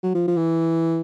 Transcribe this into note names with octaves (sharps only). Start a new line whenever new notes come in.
F#3
F3
F3
E3